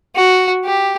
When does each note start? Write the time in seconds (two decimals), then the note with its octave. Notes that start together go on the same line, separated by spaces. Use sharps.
0.16 F#4
0.65 G4